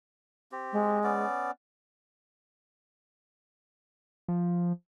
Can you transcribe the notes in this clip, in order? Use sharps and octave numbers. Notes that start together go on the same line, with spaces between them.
C4 G4
G#3
B3 C#4 D5
F3